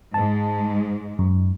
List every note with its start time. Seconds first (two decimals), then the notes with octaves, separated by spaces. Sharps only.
0.14 G#2 G#3 A5
1.19 F#2